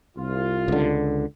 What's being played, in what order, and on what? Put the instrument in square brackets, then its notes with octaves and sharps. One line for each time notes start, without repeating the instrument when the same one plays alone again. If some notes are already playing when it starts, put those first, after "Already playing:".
[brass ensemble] C2 F4
[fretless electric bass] C#2 D3